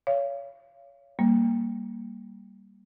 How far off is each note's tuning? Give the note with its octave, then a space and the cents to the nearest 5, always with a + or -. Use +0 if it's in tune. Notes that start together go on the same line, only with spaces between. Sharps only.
C#5 +20 F5 -25
G3 +0 A#3 +0